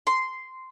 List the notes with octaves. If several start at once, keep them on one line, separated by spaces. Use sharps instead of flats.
C6